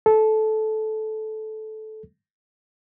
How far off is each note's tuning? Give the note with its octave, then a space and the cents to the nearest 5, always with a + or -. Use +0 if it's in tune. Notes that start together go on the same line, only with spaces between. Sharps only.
A4 -15